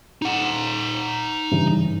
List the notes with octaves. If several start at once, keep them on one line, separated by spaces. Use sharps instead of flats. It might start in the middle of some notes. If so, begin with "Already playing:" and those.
D#4 F#5
G2 C#3 E3